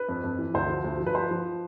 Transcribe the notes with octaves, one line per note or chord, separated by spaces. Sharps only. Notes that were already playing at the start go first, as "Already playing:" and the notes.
Already playing: B4
F2
F2
E3
D2 C5
F3
D2
F3
B4
F3 C5
F3